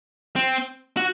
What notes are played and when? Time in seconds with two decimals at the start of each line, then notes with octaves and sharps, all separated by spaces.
0.36 C4
0.97 F#4